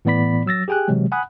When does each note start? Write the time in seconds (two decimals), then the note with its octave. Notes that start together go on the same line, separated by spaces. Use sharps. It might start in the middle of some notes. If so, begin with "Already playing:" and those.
0.05 A2 E3 B3 D5 B5 B6
0.46 F#3 E6 A6 A#6
0.68 G4 G#4 G5 G#5 F#6
0.88 C3 E3 F#3 G#3
1.12 F#5 G#5 B5 D#6 F#6